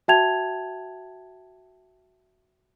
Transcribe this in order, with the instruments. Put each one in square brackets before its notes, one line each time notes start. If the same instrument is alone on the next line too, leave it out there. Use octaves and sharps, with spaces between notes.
[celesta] F#4 E5 G5 A5 G#6 F7